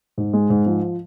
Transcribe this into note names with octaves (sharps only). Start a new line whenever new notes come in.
G#2
G#3
G#2
F3